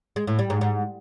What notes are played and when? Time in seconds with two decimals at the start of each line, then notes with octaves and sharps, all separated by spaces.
0.16 G#3
0.27 A2
0.39 G3
0.50 G#2
0.61 G#2